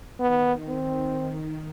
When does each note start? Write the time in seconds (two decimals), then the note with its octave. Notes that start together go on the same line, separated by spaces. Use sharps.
0.20 D#3 B3
0.68 C4